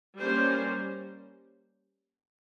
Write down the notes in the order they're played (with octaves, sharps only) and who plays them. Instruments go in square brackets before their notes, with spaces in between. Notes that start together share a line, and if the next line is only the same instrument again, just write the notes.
[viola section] G3 A#3 C#4 C5